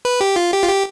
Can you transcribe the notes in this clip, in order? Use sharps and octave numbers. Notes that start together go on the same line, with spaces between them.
B4
G4
F4
G4
F4
G4